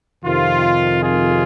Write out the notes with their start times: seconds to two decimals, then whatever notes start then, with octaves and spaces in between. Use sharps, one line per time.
0.24 F2 C3 D#3 F4
1.02 F4 G#4